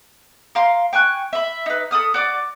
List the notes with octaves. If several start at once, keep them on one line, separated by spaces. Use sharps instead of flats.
A#4 F5 C6
G5 G#5 C#6 F#6
E5 B5
D#4 B4
A4 B5 D#6 F6
F#4 D5 D6